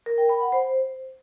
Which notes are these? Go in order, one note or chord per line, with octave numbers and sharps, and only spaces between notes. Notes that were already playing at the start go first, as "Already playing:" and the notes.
A#4
G5
B5
F#5
C5